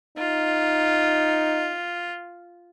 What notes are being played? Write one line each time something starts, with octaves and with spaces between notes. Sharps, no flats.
D#4 F4